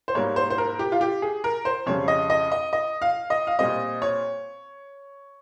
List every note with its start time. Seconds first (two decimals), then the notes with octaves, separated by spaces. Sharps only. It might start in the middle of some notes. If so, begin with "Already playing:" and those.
0.08 C5
0.15 G#2 G3 A#3 C#5
0.36 C5
0.50 C5
0.58 A#4
0.79 G4
0.92 F4
1.01 G4
1.22 G#4
1.44 A#4
1.65 C5
1.86 F2 C#3 G3 C#5
2.08 D#5
2.30 D#5
2.52 D#5
2.73 D#5
3.02 F5
3.30 D#5
3.47 F5
3.59 A#2 G3 C4 D#5
4.02 C#5